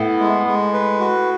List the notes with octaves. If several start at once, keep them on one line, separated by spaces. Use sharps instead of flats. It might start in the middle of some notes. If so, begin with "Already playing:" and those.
Already playing: A2 B3 E4
G#3
G#3
B4
F#4